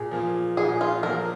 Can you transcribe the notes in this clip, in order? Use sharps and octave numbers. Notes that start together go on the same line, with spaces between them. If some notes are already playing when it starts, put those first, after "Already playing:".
Already playing: A#2 G#4
F3 A#3 F4
A#2 G#4
F4
F3 A#3 F4 A#4